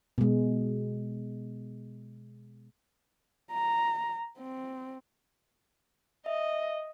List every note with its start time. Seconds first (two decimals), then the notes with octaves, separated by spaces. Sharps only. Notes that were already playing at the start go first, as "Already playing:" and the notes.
0.18 B2 G#3
3.53 A#5
4.38 C4
6.26 D#5 E5